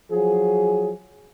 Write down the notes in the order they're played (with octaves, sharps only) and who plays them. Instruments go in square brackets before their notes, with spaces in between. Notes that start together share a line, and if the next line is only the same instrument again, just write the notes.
[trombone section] F3 F#3 G#4